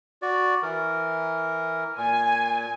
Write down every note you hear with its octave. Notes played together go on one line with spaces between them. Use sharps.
F#4 D5
E3 A#4
A#2 G#5